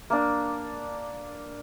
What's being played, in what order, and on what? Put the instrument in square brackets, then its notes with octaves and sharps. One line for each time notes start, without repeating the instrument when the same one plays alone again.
[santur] A#3 D4